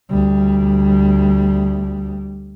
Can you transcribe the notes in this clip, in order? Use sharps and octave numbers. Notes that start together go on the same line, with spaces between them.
D2 G3